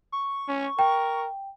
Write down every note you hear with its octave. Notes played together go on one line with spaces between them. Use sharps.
C#6
C#4
A#4 G5